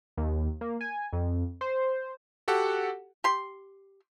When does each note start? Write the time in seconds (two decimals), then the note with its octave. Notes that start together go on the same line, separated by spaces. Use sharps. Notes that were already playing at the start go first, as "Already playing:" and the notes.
0.17 D#2
0.61 A#3
0.81 G#5
1.13 F2
1.61 C5
2.48 F#4 G4 A4 F#5
3.24 G4 C6